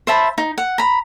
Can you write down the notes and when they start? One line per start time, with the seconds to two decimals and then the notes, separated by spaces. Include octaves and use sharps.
0.07 C5 E5 A5 B5
0.38 D#4
0.58 F#5
0.78 A#5 B5